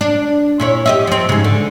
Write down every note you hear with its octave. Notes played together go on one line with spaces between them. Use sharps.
D4
A#2 E4 C#5
G4 D#5 E5
F3 C4
G#2 C#3
D3